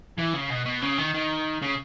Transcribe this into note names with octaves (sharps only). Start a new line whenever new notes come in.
E3
C#3
B2
B2
C#3
D#3
D#3
C#3